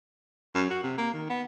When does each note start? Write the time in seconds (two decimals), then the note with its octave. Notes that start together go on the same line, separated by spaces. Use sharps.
0.55 F#2
0.70 F#4
0.83 C3
0.98 A#3
1.13 D#3
1.29 B3